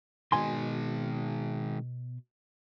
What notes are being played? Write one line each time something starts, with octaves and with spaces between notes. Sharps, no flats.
B2 D#3 G#3 G#5 C6